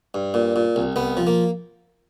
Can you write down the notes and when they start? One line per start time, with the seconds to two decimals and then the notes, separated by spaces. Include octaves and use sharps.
0.14 G2
0.34 A#2
0.56 A#2
0.76 C2
0.96 C2 B3
1.17 F3
1.27 A#3